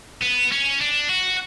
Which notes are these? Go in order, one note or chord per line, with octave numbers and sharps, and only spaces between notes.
B3
C#4
D4
F#4